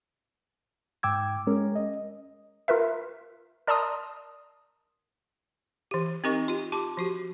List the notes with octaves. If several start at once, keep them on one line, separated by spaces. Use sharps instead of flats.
G#2 G5 D6 E6 G#6
G#3 C#4 A#4
D#5
F4 A#4 B4 E5
A#4 D5 A5 A#5 C6 D#6
E3 G4
C4 D#4 G4 A#4 D#5 C#6
F4 G4
G4 A5 C6 D6
F3 F#4 G4